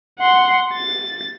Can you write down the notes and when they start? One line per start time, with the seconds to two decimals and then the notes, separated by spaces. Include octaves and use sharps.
0.19 F#5 C6
0.74 A6